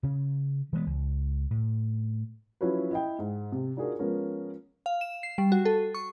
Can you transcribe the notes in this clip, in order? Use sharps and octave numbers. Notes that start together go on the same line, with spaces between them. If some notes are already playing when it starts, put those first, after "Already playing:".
C#3 C#4
E3 G#3 B3
C#2
A2
F3 F#3 C#4 E4 B4
E4 D#5 G5
G#2
C3
D4 D#4 F4 F#4 G#4 A#4
F3 G#3 B3 C#4 A#4
F5
E7
C7
G3
F#4
A4
C#6